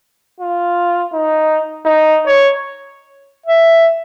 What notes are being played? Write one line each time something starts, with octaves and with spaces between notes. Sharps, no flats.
F4
D#4
D#4
C#5
E5